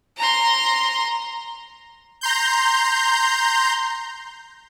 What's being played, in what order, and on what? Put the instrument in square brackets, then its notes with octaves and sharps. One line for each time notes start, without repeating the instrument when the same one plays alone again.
[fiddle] A#5 C6
[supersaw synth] A#5 C6 G6